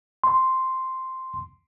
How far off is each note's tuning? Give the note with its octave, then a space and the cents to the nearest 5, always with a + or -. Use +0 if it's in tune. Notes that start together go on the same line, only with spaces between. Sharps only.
C6 +0